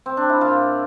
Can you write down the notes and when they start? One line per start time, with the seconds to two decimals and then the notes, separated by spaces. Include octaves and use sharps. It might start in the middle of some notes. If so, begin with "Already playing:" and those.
0.06 C4
0.17 D4
0.29 E4
0.41 A#2 F4